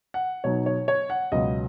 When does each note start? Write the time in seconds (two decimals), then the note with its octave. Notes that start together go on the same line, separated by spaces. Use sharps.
0.14 F#5
0.44 B2 F#3 D#4 C#5
0.66 C#5
0.88 C#5
1.10 F#5
1.32 C#2 B2 F#3 B3 D#5